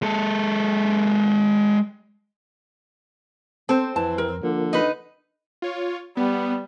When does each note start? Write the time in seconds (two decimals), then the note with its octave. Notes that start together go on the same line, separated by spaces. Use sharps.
0.02 G#3 A4
3.69 C4 A4 C5
3.96 F2 E3 A5
4.18 A#4
4.43 D3 F3 A#3
4.73 D#4 B4
5.62 F4 C#5
6.17 G3 B3